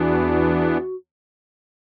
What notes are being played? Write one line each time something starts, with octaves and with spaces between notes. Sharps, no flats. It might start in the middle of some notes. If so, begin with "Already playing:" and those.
Already playing: E2 E3 B3 D4 F#4